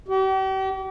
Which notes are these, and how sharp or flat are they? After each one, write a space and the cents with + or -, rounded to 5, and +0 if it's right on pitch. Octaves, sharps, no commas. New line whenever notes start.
G4 -40